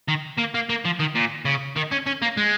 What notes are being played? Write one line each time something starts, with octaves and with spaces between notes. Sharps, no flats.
D#3
A#3
A#3
A#3
F3
D#3
A#2
C#3
D#3
C#4
C#4
A#3
G#3